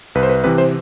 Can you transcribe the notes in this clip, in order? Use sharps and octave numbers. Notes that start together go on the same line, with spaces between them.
C2 B4
C5
B4
C3 E3 B4
C5